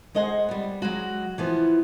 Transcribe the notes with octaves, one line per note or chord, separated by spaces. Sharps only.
G#3 C5 D#5 F#5 G#5
G3 B3
F#3 G#3 F#4
E3 F3 B3